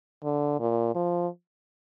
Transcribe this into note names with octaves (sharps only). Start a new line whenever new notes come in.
D3
A#2
F3